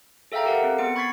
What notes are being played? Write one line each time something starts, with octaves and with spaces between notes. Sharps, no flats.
G#4 A4 E5 F5 G5 A#5
G4 A4 A#4 F5 F#5
C4
B3 G#4 C#7
B5 C#6 G#6 A6 B6 C7